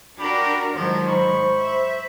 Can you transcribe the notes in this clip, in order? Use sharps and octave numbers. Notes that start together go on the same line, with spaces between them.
D4 F#4 G4 A#4 B5
G#2 D#3 F3 F#3 C5
B5 C#6
E5